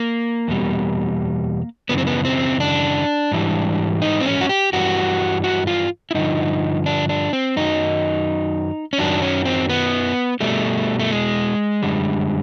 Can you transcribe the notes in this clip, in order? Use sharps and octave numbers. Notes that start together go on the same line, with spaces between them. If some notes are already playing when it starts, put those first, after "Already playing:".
Already playing: A#3
E2 B2 G3
F#2 C#3 E3 B3
C4
B3
C4
D4
G#2 E3 G3
D#4
C4
C#4
F#4
G4
G2 E3 G3 F#4
F#4
F4
E4
G2 D3 F3 D#4
D4
D4
C4
F#2 D#3 F#3 D#4
C#4
F#2 D#3 F#3 D4
C#4
C4
B3
B2 G3 A3
A3
G#3
F#2 D3 G3